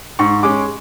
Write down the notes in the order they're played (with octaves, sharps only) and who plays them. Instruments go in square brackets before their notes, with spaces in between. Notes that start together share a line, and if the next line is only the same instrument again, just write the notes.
[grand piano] G#2 C#6
G#3 C#4 D6